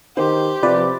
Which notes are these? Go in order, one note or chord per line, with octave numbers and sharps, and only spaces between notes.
D#3 G4 C5
C3 F3 B4 D5